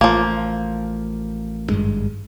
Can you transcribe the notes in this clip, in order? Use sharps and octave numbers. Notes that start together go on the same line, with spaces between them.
A1 F3 A#3
G#1 G2 G#3